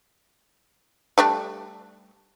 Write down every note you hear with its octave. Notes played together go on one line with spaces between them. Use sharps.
G3 A3 D4